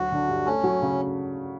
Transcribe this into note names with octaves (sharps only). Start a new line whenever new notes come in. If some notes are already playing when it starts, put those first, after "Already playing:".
Already playing: D2 F#3 F#4
D3
G2
A3 C#4
F#3
C#3